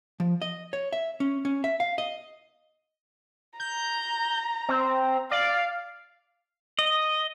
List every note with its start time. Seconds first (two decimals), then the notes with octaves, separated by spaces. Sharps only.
0.20 F3
0.42 D#5
0.73 C#5
0.93 E5
1.20 C#4
1.45 C#4
1.64 E5
1.80 F5
1.98 D#5
3.60 A#5 G6
4.69 C4
5.31 D5 F5
6.79 D#5